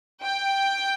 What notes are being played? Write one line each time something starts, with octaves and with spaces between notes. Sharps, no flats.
G5